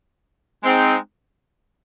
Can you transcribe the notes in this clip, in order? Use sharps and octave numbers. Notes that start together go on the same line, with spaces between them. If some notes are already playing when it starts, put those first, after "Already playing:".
G#3 C4 D#4